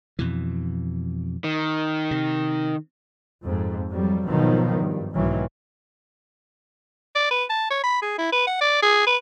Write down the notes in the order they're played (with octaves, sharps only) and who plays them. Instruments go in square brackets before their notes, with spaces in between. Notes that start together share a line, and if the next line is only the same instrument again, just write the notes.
[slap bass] F2 B2 E3
[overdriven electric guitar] D#3
[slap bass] C3
[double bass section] F2 G#2
F2 F#3 G3
G#1 B2 D#3 F3 F#3 B3
G2
B1 G#2 D#3 E3 F#3
[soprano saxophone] D5
B4
A5
C#5
B5
G#4
E4
B4
F#5
D5
G#4
B4